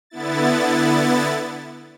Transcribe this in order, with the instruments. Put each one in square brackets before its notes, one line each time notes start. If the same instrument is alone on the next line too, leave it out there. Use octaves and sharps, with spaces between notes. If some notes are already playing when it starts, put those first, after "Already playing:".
[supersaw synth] D3 B3 E4 A6